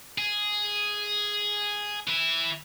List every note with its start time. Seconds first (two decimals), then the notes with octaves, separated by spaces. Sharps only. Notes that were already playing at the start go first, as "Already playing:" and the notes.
0.18 G#4
2.07 E3 E4